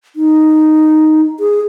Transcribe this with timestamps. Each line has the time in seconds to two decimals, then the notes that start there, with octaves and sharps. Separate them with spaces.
0.16 D#4
1.40 G#4